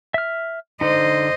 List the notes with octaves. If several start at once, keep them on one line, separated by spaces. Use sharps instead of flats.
E5 F6
D3 D#4 C5 D#5